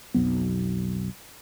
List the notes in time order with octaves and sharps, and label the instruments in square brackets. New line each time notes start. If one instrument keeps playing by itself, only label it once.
[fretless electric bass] B1 F2 F#3 B3